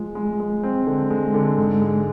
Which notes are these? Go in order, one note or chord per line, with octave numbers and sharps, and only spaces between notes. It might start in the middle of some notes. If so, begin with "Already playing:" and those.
Already playing: F3 G#3
G#3
G#3
C4
D3
G#3
D3
G#2
G#3